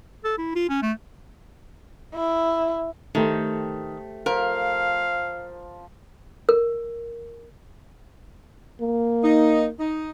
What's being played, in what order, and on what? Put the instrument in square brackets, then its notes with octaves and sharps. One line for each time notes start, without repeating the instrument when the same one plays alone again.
[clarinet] A4
E4
F4
C#4
A3
[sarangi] E4
[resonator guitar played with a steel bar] D#3 [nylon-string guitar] A3 G4 C5
[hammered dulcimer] F3 [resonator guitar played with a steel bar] A#4 [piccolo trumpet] F5
[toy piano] A#4
[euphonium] A#3
[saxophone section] D#4
D#4